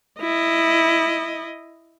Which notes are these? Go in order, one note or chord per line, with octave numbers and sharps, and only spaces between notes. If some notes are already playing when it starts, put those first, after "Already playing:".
E4 D#5